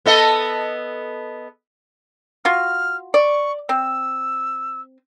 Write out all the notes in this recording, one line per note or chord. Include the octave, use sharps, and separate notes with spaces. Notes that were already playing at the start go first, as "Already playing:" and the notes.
B3 A4 D#5
F4 F#4 F6
D5 C#6
C4 E6